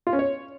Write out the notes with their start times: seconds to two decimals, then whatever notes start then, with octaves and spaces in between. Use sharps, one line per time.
0.07 F4
0.13 C#4
0.19 C#5